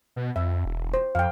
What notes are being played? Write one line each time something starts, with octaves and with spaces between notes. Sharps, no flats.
B2
F2 E5
E1
C5
F2 F5 G5